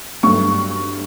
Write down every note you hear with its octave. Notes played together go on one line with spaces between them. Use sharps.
G2 F#3 A3 C#6